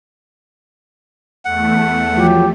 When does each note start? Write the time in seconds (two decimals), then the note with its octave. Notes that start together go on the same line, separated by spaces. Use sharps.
1.45 E2 A3 F#5
2.18 F3 F#3 G4